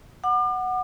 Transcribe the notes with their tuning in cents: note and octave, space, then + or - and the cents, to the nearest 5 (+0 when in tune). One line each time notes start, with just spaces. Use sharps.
F#5 +0 D6 +40